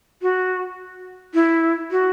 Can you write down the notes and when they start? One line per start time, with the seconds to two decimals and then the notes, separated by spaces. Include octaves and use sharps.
0.22 F#4
1.34 E4
1.91 F#4